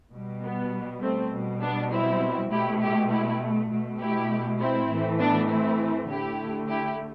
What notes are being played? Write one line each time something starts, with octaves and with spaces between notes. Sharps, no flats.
B2 G3
B3
A3 C4
B2 G3
B3 D4
C4 E4
B2 A3 E4 G4
E4 G4
E4 G4
B2 A3
E4 G4
C4 E4
A2 E3 A3
B3 D4
C4 E4
D3 A3 E4 G4
E4 G4